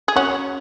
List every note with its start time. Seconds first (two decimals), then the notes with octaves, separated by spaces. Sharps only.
0.08 G#4
0.16 C#4 F#4